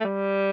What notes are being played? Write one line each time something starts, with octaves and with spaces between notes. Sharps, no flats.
A3
G3